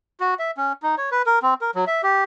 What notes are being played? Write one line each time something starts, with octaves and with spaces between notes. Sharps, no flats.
F#4
E5
C#4
D#4
C#5
B4
A#4
C4
A#4
F#3
E5
G4